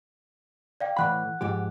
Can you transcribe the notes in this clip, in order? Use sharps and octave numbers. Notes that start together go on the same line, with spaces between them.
D5 F5 G5
A2 E3 F#5 B5 F#6
G#2 F3 G4